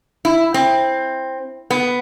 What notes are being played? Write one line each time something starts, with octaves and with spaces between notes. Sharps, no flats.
E4
C4
B3